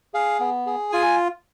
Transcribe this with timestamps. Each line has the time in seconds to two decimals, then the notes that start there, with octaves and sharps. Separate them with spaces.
0.14 G#4 F5
0.40 B3
0.66 G#4
0.92 F4 G#5